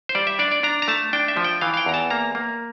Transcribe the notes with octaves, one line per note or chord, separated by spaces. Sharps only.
C5
G3 D5
E5
D4 D5
D5
D4 A#5
A#5
A3 A5
D4 G5
E5
F3
G5
E3 F5
F5
G5
E2 A#5
A5
A#3 A#5
A#3